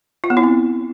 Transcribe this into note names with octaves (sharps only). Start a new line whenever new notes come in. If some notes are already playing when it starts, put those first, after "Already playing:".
F4
B3
E4
C4